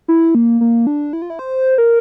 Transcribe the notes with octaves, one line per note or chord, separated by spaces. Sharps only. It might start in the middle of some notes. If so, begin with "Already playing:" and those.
E4
A#3
A#3
D4
E4
F4
E4
C5
A#4